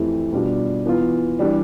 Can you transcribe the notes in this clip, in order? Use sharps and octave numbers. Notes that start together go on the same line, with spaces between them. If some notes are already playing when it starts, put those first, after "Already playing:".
Already playing: F2 E3 A3 E4 G4
B2 G3 D4 F4
E3 B3 F4
E3 G3 D4